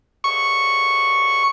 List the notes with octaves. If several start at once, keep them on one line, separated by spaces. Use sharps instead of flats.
C#6